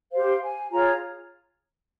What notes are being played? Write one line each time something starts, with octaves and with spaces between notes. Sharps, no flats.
G4 C5 F5
G#5
F4 G#4 C#5 A#5